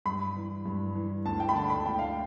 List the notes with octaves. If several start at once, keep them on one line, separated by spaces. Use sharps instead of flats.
G2 B5
E3
G2
E3
D2 A5
G5
B5
D3 A5
B5
D2 G5
F5